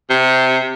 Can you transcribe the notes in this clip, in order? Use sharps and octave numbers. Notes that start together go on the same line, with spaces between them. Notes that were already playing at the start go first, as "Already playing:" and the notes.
C3